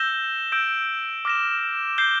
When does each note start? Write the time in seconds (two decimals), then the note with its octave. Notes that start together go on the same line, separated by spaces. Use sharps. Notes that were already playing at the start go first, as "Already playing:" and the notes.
Already playing: E6 G6 A#6 E7 G7
0.52 E6 G6 A#6 D7
1.25 D6 F6 A#6 E7
1.98 G6 C7 E7 G7